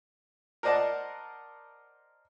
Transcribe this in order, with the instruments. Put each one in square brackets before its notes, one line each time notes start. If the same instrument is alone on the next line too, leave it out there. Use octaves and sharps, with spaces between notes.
[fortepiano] A#4 C5 D5 D#5 F#5 A5